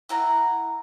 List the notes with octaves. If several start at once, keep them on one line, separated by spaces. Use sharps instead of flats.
E4 F#5 A#5